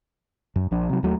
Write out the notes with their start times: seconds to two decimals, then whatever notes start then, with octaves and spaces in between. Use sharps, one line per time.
0.56 F#2
0.71 A#1 F3 D4
0.89 C3 F#3
1.03 D#2 F#3 A3